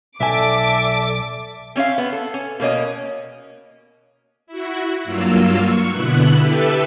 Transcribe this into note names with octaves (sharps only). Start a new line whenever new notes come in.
B1 A4 D5 E5 G#5 D6
C4 C#4 E5 F5
B3
A4
C#4
B2 A#3 C#4 D#5
E4 F#4
G2 F#3 A#3 F4 E6
C#6
B2 D3 B3 E4 F#6
G4 A4 B4 E5